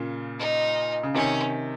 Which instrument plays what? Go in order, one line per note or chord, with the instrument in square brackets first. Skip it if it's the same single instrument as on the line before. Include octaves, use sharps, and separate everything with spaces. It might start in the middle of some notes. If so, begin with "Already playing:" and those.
Already playing: [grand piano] A#2 C#3
[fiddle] D#4
[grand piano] C#3
[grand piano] C3 D#3 [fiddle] C#4